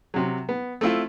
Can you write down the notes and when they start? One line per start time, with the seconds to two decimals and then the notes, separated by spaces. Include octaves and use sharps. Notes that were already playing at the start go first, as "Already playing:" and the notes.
0.14 C3 F#3
0.49 B3
0.81 A3 C4 E4 F4